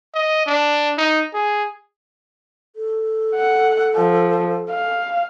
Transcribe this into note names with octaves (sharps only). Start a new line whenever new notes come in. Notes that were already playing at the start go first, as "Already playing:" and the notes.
D#5
D4
D#4
G#4
A4
F#5
F3
F5